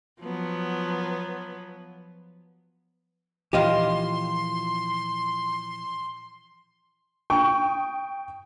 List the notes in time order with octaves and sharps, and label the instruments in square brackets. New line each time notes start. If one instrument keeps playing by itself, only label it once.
[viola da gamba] F3 F#3 B3
[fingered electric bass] A#2 E3 F3 [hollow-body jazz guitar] G4 D#5 F5 [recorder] C6
[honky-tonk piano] G5 C#6 D#6